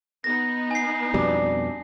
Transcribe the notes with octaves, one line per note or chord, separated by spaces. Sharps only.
B3 D#4 A#6
G#5 C7
F2 B2 G3 D4